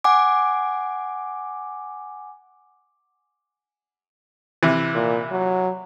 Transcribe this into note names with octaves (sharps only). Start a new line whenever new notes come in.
F#5 G#5 D6
C3 E3
A#2
F#3